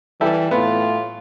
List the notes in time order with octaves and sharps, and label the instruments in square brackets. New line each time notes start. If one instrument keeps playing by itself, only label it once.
[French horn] E3 [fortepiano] G3 E4 A4
[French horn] A2 [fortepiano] B3 [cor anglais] F4